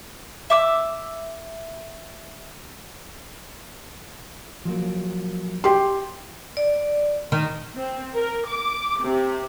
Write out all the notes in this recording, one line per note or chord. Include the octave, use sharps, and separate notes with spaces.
E5 D6 E6
F3 F#3 A#3
G4 C6
D5
D#3
C4
A#4
D6
C3